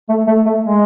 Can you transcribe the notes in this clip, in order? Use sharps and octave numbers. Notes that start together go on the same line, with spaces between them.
A3
A3
A3
G#3